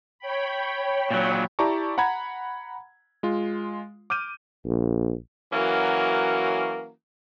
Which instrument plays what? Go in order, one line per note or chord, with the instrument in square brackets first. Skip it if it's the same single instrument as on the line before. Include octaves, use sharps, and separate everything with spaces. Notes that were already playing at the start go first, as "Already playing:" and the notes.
[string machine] C#5 G5 B5
[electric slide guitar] A#2 F#3
[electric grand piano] E4 G4 D5 A5 A#5 C#6
F#5 A#5 B5 G#6
G#3 F4
D6 F6 G6 D#7
[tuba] A#1
[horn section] E3 F#3 A#3 C#4 F#4 A#4